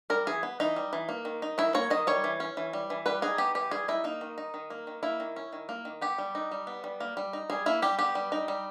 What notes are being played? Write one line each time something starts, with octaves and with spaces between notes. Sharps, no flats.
G3 A#4
E3 G#4
B3
E3 D#4
G3
E3
A#3
D#3
D#4
D#3 E4
A#3 C#5
D#3 D#5
G3 C#5
E3
C#4
E3
G3
E3
G3 B4
D#4 G#4
B3 G4
E3 G4
G3 G#4
D#4 E4
A#3 D#4
D#3
D#4
D#3
A#3
D#3
A#3 E4
D#3
C#4
D#3
A#3
D#3
B3 G4
G3
D#4
G3
B3
G3
A#3
G3
D#4
G3 G#4
A#3 E4
G3 G4
B3 G4
G3
D#4
G3